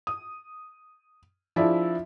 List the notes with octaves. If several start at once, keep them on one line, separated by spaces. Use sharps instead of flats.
D#6
F3 D4 E4 G#4 D5 E5